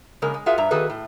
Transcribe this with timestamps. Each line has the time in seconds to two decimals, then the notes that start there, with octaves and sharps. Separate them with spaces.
0.22 C#3 G#3 A#3 A#4
0.34 G#3
0.46 F4 F#4 G#4 A#4 E5 F5
0.58 G2 E5 A#5
0.71 D#3 A#3 F#4 G#4 A4 B4
0.90 A2